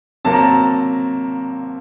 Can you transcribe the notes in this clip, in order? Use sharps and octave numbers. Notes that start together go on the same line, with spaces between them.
C3 F#3 A#3 A5
A#5
A5